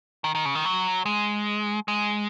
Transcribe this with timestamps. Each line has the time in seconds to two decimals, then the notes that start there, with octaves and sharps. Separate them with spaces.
0.24 D#3
0.35 D#3
0.45 C#3
0.55 D#3
0.65 F#3
1.06 G#3
1.88 G#3